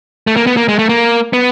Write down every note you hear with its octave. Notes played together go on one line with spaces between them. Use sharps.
A3
A#3
B3
A#3
G#3
A3
A#3
B3